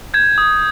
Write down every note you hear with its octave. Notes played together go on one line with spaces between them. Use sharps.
G6 G#6
D#6